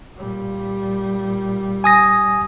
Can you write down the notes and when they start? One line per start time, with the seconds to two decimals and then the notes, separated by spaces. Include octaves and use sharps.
0.17 A#2 G3
1.84 G#5 D#6 A#6